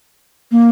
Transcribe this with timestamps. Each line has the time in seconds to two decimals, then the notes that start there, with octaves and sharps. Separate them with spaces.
0.52 A#3